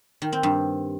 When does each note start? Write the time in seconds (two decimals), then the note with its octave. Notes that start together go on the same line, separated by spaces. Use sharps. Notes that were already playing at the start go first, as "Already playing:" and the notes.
0.22 D#3
0.32 C4
0.43 G2